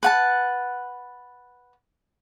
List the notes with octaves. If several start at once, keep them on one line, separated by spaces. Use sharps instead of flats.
B4 F#5 A5